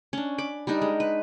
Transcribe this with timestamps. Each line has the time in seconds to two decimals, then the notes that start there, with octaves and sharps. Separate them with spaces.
0.13 C#4 D4
0.38 B5 D6
0.67 G3 D4 D#4 A#4
0.81 G#3
1.00 B4